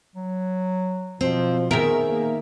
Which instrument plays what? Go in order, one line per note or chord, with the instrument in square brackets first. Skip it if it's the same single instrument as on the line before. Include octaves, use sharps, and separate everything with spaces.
[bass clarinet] F#3
[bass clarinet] B2 [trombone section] F3 [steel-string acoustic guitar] C4
[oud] D#3 A#4 [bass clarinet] B3 [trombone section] G#4 [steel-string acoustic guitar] E5
[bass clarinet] A#3